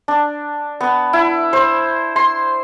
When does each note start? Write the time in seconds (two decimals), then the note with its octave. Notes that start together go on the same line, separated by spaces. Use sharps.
0.08 D4
0.81 B3
1.13 E4
1.53 C5
2.16 C6